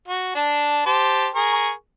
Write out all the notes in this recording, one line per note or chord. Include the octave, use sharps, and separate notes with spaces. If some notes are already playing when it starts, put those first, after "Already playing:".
F#4
D4 A5
G4 C5 A5
G#4 A#4 C#6